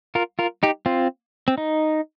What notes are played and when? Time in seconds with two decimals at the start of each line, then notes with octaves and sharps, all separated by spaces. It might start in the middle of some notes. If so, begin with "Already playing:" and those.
0.15 F4 A#4
0.39 F4 A#4
0.63 D#4 G4
0.86 C4 F4
1.48 C4
1.58 D#4